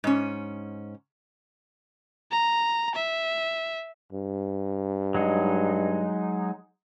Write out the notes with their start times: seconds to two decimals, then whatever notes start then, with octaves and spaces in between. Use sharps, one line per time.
0.04 G#2 C#4
2.32 A#5
2.95 E5
4.13 G2
5.15 F#3 G#3 D#4